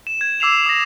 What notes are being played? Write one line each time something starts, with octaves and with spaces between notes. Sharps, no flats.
E7
G#6
D6 E6 C7 E7 F7
D#6 A#6